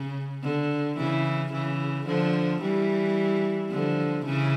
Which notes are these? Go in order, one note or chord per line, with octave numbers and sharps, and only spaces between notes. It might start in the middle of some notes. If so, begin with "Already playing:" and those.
Already playing: C#3
D3
C#3 E3
C#3 E3
D3 F3
E3 G3
D3 F3
C#3 E3